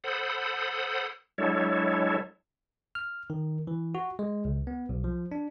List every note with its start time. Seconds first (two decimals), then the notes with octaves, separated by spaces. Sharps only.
0.04 A4 C5 F#5 B5 D#6
1.38 F#3 G#3 D4 E4 A4 C#5
2.95 F6
3.30 D#3
3.67 E3
3.95 F#4
4.19 G#3
4.45 C#2
4.67 B3
4.89 B1
5.04 F3
5.32 D4